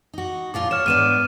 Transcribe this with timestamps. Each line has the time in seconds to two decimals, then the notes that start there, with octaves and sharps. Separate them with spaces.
0.14 D#4 F#4
0.54 A#2 F3 F4 D6
0.71 C#5 F6 E7
0.86 G#2 B3 D4 F6 D#7 E7